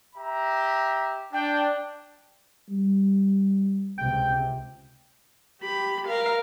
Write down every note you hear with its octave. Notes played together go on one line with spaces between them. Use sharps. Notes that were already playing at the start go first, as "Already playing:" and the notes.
G4 E5 A#5
D4 G5
G3
C#2 C3 G5
G4 B5
A#4 F5